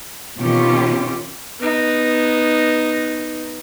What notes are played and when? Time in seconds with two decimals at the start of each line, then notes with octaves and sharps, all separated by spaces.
0.40 B2 D#3 C4 C#4 F4 G4
1.60 B3 D#4